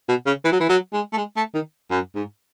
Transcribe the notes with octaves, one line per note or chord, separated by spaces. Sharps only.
B2
C#3
E3
F#3
E3
F#3
G#3
A3
G#3
A3
D#3
F#2
G#2